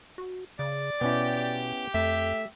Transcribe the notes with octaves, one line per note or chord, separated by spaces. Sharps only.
F#4
C#3 D5
B2 B3 C#4 E4 G4
F2 A3 E5